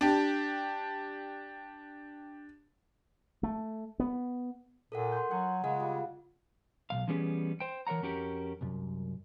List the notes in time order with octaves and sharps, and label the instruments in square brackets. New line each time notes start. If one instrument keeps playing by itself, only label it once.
[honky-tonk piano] D4 G4
[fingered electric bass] A3
B3
[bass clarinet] A#2 [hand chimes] A4 A#4 F#5
[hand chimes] C6 G6
[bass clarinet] F#3 [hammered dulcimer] F#5 G#5
[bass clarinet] C#3 [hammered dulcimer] G#3 F4 G#5 [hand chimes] F#5
[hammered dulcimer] G3
[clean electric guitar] B1 D#3 F5
D3 E3 G3 B3 C#4 G#4
C5 G5
E3 A#4 C#5 F#5 A#5
F2 C#4 F#4 G4 A#4
C2 F#2